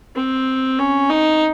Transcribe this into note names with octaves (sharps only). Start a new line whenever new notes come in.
C4
C#4
D#4